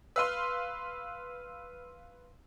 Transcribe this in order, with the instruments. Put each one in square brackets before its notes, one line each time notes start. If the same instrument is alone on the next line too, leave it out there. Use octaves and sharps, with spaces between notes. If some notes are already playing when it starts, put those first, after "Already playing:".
[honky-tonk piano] B4 F5 C6 [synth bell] E6 F6 D#7